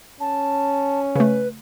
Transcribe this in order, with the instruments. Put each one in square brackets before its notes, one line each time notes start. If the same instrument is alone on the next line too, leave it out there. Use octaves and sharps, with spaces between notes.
[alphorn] C#4 [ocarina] A5
[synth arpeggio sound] C#3 A3 [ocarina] B4